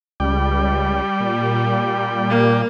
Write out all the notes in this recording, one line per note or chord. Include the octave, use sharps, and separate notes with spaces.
C#2 G3 D5 G5
A#2
A#3